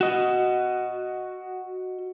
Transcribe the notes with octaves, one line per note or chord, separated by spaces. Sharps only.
F#4 D#5